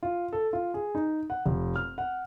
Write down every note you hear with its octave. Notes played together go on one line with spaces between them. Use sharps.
F4
A4
F4
G#4
D#4
F#5
F1
F6
F#5